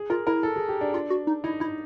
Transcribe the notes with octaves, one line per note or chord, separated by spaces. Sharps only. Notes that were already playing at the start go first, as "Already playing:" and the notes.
Already playing: G#4
F4 A#4
E4 A#4
A4
G#4
G4
D4
F4
F#4
D#4
D#4 E4
D#4 E4